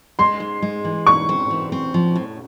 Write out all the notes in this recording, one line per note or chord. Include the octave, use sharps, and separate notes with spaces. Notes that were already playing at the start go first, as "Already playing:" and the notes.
G#3 C6
G#2
G#3
E3
G#2 C#6
C4
E3
C4
F3
A2